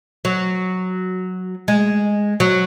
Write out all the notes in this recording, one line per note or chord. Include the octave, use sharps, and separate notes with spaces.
F#3
G#3
F#3